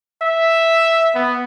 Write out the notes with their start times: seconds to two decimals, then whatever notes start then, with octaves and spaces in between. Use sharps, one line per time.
0.22 E5
1.15 B3